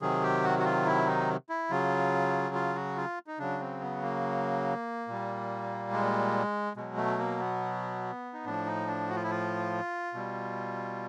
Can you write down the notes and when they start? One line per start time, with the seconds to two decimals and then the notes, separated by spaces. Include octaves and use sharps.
0.02 C3 D#3 F#3 G#4
0.23 G4
0.44 F#4
0.59 F#4
0.65 F4
0.86 E4
1.07 D#4
1.50 E4
1.70 C#3 F#3 F4
2.55 F4
2.75 F#4
2.97 F4
3.27 D#4
3.39 C#3 F#3 D4
3.60 C4
3.81 B3
4.02 A#3
5.08 A#2 G3
5.92 G#3
6.77 B2 F#3 G#3
6.97 A3
7.19 A#3
7.39 B3
8.34 D#4
8.45 A2 F3 D4
8.67 D#4
8.88 D4
9.09 F#4
9.16 F4
9.23 E4
9.30 F4
10.14 B2 G3